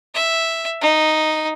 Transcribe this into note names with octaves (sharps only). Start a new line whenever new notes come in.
E5
D#4